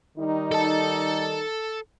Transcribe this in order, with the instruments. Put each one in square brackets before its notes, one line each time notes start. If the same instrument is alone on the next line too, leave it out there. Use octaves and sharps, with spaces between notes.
[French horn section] D#3 G3 D#4
[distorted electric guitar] A4 A5